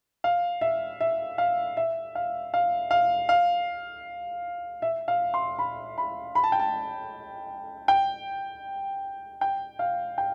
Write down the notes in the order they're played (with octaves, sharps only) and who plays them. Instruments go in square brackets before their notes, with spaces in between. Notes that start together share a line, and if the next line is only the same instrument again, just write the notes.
[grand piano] F5
E5
E5
F5
E5
F5
F5
F5
F5
E5
F5
C6
B5
B5
B5
A5
G5
A5
G5
G5
F5
G5